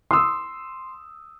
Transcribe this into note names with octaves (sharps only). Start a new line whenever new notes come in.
C6 D#6 E6